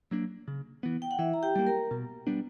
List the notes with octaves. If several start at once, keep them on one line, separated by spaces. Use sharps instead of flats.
F#3 A#3 D4
C#3
E3 B3
G5
F#5
E3 E4 E5
A#5
G4 G5
G3 A#3 G5
A#4 A#5
B2
G3 B3 D4